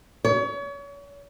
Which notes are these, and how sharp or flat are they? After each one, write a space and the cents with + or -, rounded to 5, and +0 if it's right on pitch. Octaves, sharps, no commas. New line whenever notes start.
C#5 +35